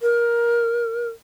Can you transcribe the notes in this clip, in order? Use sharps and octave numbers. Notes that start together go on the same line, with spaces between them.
A#4